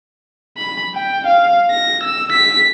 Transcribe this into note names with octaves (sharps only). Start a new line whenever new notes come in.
B5
G5
F5
A#6
E6
B6